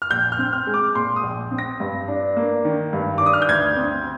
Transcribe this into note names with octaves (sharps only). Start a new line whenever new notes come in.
F6
A#1 G6
F6
C4
F6
G#3
D6
A#2 C6
D#6
A#1
C4
A#6
G2
D4
A#3
D#3
G2
D4 D6
D#6
F6
G6
D2 G#6
C4